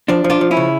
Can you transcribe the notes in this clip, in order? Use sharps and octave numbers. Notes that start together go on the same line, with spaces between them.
F3 D4
F3
D4 F4
F3
C#4 E4
C#3